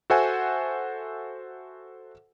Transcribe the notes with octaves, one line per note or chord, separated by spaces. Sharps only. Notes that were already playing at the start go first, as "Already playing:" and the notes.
F#4 A4 C5 E5 F#5 G#5